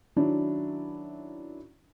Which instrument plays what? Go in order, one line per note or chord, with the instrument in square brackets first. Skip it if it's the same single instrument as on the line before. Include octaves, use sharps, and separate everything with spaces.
[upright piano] D#3 F#3 C#4 D4 E4